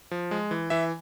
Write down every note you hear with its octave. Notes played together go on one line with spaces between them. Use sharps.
F3
G#3
E3
E3 E5